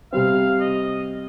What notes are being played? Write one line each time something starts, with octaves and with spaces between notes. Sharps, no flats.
C3 G3 C4 F5
D#5